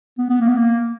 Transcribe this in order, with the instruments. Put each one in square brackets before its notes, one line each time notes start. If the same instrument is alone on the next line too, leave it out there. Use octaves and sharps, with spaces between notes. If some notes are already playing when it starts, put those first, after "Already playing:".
[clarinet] B3
B3
A#3
B3
A#3